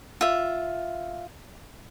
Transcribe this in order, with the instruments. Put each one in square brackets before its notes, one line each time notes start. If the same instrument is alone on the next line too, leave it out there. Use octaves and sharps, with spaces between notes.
[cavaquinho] F4 E5